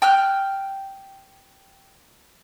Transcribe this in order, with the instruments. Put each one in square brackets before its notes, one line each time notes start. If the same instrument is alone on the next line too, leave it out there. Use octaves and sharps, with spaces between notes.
[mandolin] G5 F6 F#6